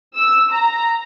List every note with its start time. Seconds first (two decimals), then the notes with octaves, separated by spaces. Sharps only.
0.16 E6
0.52 A#5